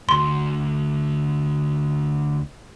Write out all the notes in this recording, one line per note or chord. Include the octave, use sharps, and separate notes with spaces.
D2 C6